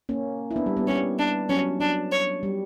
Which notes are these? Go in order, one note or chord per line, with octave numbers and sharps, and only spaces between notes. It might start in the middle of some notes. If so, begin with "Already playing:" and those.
A#3 C#4
E4
B3 D4
G3
G3 B3
G3 C#4
D4
F#3 C#4
F#3 D4
C#5
G3